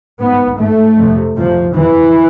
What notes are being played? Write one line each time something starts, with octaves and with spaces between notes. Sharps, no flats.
G#2 B3
G#2 A3
F2 C3
F2 C3 F3
F2 C3 E3